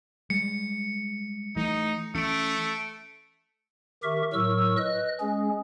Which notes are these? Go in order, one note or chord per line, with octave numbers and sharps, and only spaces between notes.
G3 G#3 C#7
E3 A3 D#4
E3 A3 C#4 C#7 D7
D#3 G4 A#4 E5 C#6
A2 F#3 A#4 C#6 E6
B4 D#5 F#6
G#3 C#4 G#4